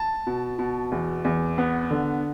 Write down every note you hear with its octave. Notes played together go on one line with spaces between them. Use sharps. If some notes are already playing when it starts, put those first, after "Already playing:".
Already playing: A5
B2
B2
E2
E2
B3
D3